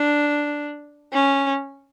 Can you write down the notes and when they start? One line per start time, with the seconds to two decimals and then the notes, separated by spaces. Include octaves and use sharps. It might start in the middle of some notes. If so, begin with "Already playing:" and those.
Already playing: D4
1.13 C#4